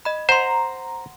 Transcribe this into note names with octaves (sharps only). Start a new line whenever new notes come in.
D#5 B5
C5 F#5 A#5 C6